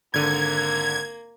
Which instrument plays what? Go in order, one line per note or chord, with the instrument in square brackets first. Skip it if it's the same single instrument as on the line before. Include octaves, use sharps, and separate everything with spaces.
[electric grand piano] G#1 D3 D#7 [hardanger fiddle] A#3 [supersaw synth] G#6